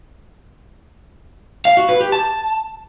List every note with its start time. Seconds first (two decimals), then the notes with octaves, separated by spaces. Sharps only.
1.65 F5
1.77 F#4
1.89 B4
2.01 G4
2.12 A5